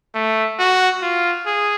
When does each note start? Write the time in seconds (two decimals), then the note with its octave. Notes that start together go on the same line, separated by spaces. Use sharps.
0.14 A3
0.59 F#4
1.02 F4
1.46 G#4